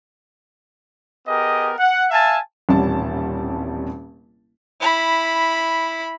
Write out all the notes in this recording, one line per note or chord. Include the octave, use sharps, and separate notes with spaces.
B3 G4 G#4 A#4 D#5
F#5
E5 F5 G#5 A5
D#1 A1 C3 G3 C#4 A5
E4 B5